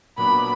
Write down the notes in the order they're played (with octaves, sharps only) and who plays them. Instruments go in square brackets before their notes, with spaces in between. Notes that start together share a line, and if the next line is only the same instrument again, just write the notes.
[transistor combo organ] A#2 F#3 B3 D4 [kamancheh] B5